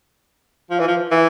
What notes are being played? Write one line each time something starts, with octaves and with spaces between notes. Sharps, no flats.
F3
E3
F3
E3